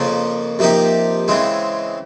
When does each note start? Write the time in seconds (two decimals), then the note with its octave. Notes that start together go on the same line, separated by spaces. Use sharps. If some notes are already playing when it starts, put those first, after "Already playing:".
Already playing: F2 C#3 F3 A#3
0.59 C3 F3 A#3 D#4 G4
1.28 C#3 E3 G#3 C4